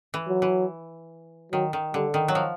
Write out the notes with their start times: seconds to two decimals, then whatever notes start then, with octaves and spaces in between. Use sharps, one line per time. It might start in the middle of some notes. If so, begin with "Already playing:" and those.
0.14 E3
0.28 F#3
0.42 E3
1.52 D#3 F#3
1.73 D#3
1.94 D3 G3
2.14 D#3
2.28 F#3
2.35 F3